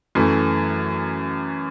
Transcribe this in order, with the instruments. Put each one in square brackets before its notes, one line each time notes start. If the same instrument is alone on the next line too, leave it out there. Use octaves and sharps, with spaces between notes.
[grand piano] F#2 E3 A3